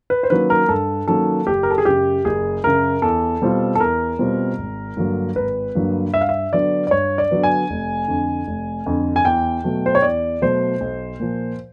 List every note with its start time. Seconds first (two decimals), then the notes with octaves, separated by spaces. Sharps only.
0.10 B4
0.23 C5
0.30 D#3 F#3 A#3 C#4 B4
0.50 A#4
0.68 G2 A4
1.08 D#3 F#3 A#3 C#4 A4
1.47 F#1 G4
1.63 A#4
1.71 A4
1.78 G#4
1.85 F#2 C#3 G4
2.25 F#1 G#4
2.64 F#2 C#3 A#4
3.02 E2 A4
3.42 B2 G3 C4 F4
3.75 A4
3.80 E2 A#4
4.19 B2 G3 C4 F4
4.58 G#1
4.97 G2 D3 F#3 A#3
5.36 G#1 B4
5.75 G2 D3 F#3 A#3
6.13 G2 E5
6.21 F5
6.29 E5
6.52 D3 F#3 B3 D5
6.87 D5
6.91 G2 C#5
7.18 D5
7.31 D3 F#3 B3
7.43 G#5
7.70 F1
8.08 F2 D3
8.47 F1
8.86 F2 D3
9.16 G#5
9.25 E2 G5
9.64 B2 F#3 A3
9.86 C5
9.95 C#5
10.02 E2 D5
10.42 B2 F#3 A3 C5
10.81 B1
11.20 A#2 F3